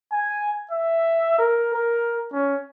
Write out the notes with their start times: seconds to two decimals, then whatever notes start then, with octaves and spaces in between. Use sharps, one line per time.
0.12 G#5
0.71 E5
1.38 A#4
1.74 A#4
2.33 C#4